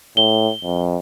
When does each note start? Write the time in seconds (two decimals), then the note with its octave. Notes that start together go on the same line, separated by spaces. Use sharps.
0.17 A2 G7
0.64 F2